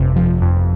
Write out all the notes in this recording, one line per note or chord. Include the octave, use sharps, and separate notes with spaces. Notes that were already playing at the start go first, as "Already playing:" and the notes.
Already playing: G1 F2 C3
F3
F2